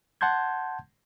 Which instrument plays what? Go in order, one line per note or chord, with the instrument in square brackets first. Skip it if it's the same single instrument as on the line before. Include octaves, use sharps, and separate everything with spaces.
[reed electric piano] F#5 A5 C6 G6 G#6